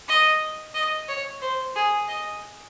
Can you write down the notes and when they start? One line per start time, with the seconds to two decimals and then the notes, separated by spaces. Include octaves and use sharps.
0.08 D#5
0.75 D#5
1.08 C#5
1.42 C5
1.76 G#4
2.08 D#5